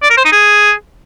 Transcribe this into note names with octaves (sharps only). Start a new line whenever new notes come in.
D5
A#4
C5
D#4
G#4